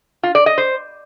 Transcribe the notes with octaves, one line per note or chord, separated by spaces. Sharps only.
F4
D5
D#5
C5